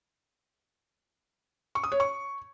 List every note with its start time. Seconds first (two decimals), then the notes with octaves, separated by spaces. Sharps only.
1.75 C#6
1.84 D#6
1.92 C#5
2.00 C#6